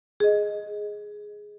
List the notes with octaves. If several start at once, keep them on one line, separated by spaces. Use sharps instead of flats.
G#4 D#5